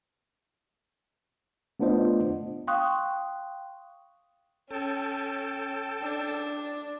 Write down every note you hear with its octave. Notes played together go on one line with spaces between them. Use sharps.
A3 B3 D4 F4 C5 D#5
F5 G5 C6 C#6 D#6 F#6
C#4 A4 G5 A5
D4